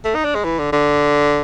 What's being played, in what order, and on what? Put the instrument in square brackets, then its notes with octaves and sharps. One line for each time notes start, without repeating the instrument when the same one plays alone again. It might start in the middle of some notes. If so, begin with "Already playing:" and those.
[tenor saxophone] A3
D#4
D4
G#3
E3
D3
D3